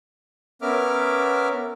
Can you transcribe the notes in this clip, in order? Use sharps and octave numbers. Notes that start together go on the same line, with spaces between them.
B3 C#4 A#4 E5 D6 F6